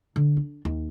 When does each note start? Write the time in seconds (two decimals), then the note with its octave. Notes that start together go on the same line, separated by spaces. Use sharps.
0.16 D3
0.37 D4
0.65 D#2